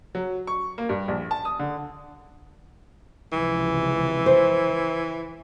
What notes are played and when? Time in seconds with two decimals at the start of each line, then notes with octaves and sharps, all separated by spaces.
0.15 F#3
0.47 C#6
0.78 A#3
0.89 G2
1.08 A#1
1.31 A5
1.45 D#6
1.59 D3
3.33 C#2 C3 E3 F3
4.26 C5